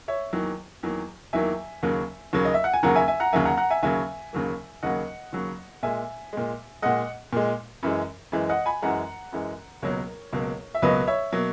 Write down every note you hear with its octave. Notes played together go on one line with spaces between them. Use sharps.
C#5 E5
E2 D#3 F#3 A#3
E2 D#3 F#3 A#3
E2 D#3 F#3 A#3 E5 G#5
D#2 C#3 F#3 A#3
D#2 C#3 F#3 A#3
D#5
E5
F#5
G#5
D#2 C#3 F#3 A#3 F#5 A#5
E5 G#5
E5 G#5
F#5 A#5
D#2 C#3 F#3 A#3 E5 G#5
F#5 A#5
F#5 A#5
E5 G#5
D#2 C#3 F#3 A#3 E5 G#5
D#2 C#3 F#3 A#3
D#2 C#3 F#3 A#3 D#5 F#5
D#2 C#3 F#3 A#3
A#2 G#3 E5 G#5
A#2 G#3
A#2 G#3 D#5 F#5
A#2 G#3
F#2 E3 G#3
F#2 E3 G#3
D#5 F#5
G#5 B5
F#2 E3 G#3 F#5 A#5
F#2 E3 G#3
C#2 B2 F#3 A#3 A#4 C#5
C#2 B2 F#3 A#3
E5
C#2 B2 F#3 A#3 B4 D#5
C#5 E5
B2 F#3 A#3